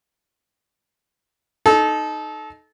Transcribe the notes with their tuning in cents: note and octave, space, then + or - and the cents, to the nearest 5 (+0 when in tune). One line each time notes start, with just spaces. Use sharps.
D#4 +0 A4 -25